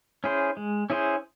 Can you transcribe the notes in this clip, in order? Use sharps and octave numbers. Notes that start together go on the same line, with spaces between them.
C#4 E4 G#4 C5
G#3
C#4 E4 G#4 C5